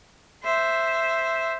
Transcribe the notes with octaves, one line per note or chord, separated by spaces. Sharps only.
C5 E5